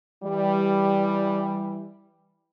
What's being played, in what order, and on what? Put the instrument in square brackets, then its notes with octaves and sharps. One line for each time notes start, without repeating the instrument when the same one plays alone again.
[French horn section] E3 G3